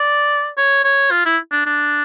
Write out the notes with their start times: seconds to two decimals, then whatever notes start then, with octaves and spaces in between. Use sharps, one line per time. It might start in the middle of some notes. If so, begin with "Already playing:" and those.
Already playing: D5
0.57 C#5
0.84 C#5
1.11 F4
1.25 E4
1.52 D4
1.66 D4